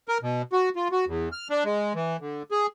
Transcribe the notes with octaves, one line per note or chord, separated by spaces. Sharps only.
A#4
B2
F#4
F4
F#4
E2
F6
D4
G#3
E3
D3
G#4